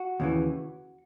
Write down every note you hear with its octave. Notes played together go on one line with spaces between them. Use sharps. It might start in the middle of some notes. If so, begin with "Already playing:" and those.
Already playing: F#4
D#2 C#3 E3